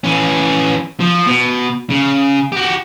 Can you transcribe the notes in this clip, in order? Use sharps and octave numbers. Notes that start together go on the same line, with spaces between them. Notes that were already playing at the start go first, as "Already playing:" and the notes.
E3 C#4
F3
B2
C#3
F#4 G4